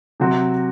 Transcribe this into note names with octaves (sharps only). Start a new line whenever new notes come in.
C3 F#3 C4 F#4